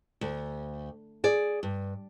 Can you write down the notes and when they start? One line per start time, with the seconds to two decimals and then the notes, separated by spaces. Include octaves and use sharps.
0.21 D2
1.24 G#4 D5
1.63 G2